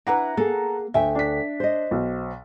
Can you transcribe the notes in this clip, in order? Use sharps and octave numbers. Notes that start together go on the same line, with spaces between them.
D4 E4 B4 F#5 A#5
A#3 G#4 A4
D2 E5 G5 G#5
D4 B6
C5 D#5
B1